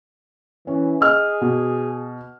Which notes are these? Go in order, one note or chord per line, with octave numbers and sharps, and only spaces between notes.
E3 C#4
G#4 D#5 F6
B2